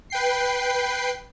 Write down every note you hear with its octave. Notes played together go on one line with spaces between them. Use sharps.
B4 G5 C7